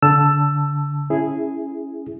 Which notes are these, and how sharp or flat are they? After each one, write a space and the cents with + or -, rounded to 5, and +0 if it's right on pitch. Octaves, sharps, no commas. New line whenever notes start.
D3 -25 A5 +0 E6 +15
C#4 +0 E4 +0 G#4 +0